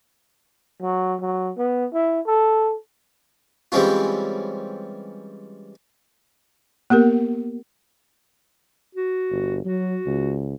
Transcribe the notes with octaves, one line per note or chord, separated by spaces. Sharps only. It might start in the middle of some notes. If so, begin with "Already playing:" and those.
F#3
F#3
B3
E4
A4
E3 G3 G#3 C4 C#4 F4
A#3 B3 G4 A#4
F#4
G1
F#3 F#4
C#2